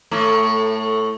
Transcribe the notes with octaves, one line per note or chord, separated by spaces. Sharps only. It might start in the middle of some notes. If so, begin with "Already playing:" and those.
A2 A3